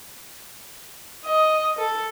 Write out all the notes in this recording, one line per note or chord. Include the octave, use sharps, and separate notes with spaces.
D#5
A4